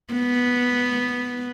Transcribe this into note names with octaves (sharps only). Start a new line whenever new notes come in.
B3